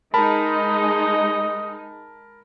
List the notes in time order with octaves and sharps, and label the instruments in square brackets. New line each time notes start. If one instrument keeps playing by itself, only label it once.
[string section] G#3 D#4 [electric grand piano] A#4 A5 B5 [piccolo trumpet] D#5